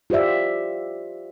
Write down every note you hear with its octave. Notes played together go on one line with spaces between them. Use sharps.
F4 G4 C5 D5 E5